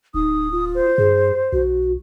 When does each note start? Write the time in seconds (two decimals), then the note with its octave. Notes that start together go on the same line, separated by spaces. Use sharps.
0.14 D1 D#4 D#6
0.52 F4
0.75 C5
0.98 G2 G#4
1.53 B1 F#4